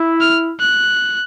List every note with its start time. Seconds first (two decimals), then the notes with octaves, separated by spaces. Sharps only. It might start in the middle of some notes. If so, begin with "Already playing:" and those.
Already playing: E4
0.21 F6
0.60 F#6